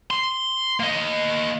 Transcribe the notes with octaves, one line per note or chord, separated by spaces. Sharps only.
C6
A#3 D#5